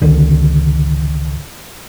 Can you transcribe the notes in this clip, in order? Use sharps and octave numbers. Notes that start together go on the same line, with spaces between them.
G#1 C#2 D3 D#3